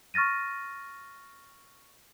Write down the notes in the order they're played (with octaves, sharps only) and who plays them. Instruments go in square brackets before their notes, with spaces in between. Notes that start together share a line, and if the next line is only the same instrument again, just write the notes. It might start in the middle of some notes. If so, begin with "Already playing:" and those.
[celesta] C#6 F6 A6 A#6 D#7